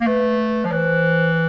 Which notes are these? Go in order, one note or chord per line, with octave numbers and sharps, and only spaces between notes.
A#3
A3 B4
F3
E3 C5 C#5